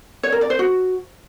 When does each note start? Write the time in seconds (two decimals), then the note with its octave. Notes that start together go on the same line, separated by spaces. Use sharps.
0.23 C#5
0.32 A#4
0.41 D5
0.50 C5
0.59 F#4